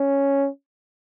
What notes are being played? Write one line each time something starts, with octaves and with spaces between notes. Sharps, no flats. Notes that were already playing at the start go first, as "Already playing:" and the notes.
Already playing: C#4